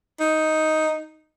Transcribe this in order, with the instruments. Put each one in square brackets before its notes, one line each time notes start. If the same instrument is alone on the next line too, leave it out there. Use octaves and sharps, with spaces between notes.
[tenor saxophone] D#4